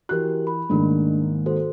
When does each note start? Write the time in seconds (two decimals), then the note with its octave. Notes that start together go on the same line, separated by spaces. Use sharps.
0.09 E3 F#4 G4 A#4 F#6
0.47 B5
0.70 G#2 D#3 A3 A#3 D4
1.46 F#4 A4 C5